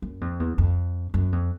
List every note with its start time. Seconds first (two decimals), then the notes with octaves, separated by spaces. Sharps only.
0.02 F#2
0.21 F2
0.40 E2
0.58 F2
1.14 F#2
1.32 F2